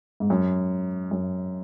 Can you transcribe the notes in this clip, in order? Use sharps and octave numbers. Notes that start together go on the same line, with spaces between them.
G#2
F#2
F#2